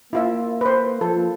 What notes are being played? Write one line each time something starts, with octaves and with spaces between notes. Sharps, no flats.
A#3 E4 F4 E5
B4 C5
F3 A4